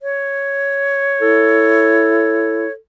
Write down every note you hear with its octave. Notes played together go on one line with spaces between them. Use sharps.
C#5
E4 A4